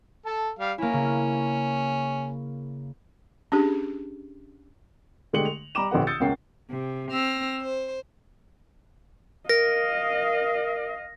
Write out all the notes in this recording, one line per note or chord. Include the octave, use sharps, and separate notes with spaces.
A4 A5
G3 F5
A#3 C#4 E4
C#3
C#4 D4 G4 G#4
D3 G#3 A3 G4 C#7 F#7
F7
G3 A#5 B5 D6 E7
A#1 D3 G4 B4 F#5
D#6 E6 G6 A6 C#7
C#2 A#3 C#4 F#5 G5 C7
C3
C4 E6 F6 A#6
C5
A#4 D#5 F5 A#6